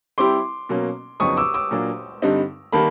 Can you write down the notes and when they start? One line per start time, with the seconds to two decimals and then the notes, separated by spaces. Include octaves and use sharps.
0.18 G3 C4 E4 G4 C6 D6
0.69 B2 F#3 A#3 C#4
1.20 F2 C#3 F#3 B3 D#4 C#6 D#6
1.37 D6 E6
1.54 D6 E6
1.71 A#2 F#3 A#3 D4
2.22 G2 D3 G3 C4 D#4
2.73 D#3 G3 A#3 A5 B5